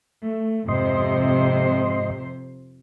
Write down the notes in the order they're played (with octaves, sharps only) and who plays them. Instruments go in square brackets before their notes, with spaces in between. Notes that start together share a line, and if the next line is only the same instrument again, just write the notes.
[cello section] A3
[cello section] F2 C3 C5 [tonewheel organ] G#2 D#5 C6